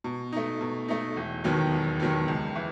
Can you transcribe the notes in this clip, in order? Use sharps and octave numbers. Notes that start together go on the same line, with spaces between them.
B2
A3 D#4
B2
A3 D#4
E1
D#2 D#3 F#3 B3
E1
D#2 D#3 F#3 B3
C#2
E3